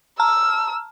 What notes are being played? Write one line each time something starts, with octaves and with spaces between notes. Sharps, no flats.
A5 A#5 E6 F6